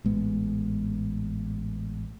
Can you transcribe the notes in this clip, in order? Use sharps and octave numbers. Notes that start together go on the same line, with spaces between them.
A1 G#2 G#3 B3